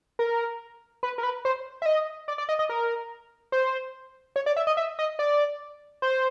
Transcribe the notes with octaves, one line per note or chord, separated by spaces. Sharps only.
A#4
B4
A#4
B4
C5
E5
D#5
D5
D5
D#5
D#5
A#4
C5
C#5
D5
E5
D#5
E5
D#5
D5
C5